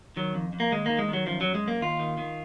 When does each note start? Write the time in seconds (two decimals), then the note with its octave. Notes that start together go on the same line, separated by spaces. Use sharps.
0.16 D#3 F#3
0.34 F2
0.53 F2
0.60 A#3
0.72 D#2 G#3
0.86 D#3 A#3
0.99 G#3
1.08 D#3
1.13 F#3
1.26 F#2 F3
1.41 F#2 F#3
1.55 G#3
1.63 F#2 A#3
1.81 D#2 F4
1.99 D#3
2.18 D#3